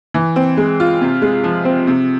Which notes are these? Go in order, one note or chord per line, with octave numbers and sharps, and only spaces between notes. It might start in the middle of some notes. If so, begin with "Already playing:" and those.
E3
C4
G#3
F4
C3
G#3
F3
C4
C3